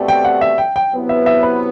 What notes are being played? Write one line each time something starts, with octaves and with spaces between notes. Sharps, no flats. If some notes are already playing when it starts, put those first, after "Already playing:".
Already playing: B2 A3 C4 G4 D5
G5
F#5
E5
G5
G5
C3 F#3 B3 E4
E5
E5
B4